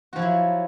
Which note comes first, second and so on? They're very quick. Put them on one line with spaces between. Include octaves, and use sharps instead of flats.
F#4 F3 E4 F#3